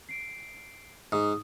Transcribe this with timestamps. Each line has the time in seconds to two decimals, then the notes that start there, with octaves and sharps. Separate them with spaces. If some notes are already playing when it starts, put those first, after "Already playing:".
0.09 C7 D7
1.12 G#2 D#6